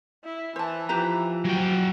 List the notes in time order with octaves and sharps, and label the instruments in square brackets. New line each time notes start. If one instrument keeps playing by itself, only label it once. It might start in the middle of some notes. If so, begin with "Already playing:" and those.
[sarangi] E4
[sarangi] E3 [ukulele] C5 A5
[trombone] F3 [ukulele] G4 B4 A#5
[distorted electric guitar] F#3 G5 [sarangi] F#4